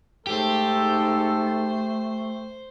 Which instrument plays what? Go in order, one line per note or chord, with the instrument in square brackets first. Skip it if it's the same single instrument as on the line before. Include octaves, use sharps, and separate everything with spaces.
[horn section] G#2 A4 [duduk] A3 [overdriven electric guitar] G4 [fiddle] C5